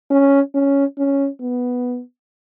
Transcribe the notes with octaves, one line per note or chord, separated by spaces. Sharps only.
C#4
C#4
C#4
B3